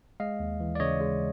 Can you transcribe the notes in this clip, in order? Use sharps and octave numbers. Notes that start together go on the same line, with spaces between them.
G#3 D#5 F5
D#2
E3
D5
C#3 C#5 D#5
G#3